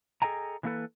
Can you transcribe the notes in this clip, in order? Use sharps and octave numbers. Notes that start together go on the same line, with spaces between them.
G#4 A4 D#5 G5 G#5 A#5
E3 G#3 A#3 B3 A4 B4